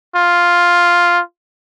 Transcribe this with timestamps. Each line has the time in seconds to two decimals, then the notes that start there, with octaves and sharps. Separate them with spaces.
0.16 F4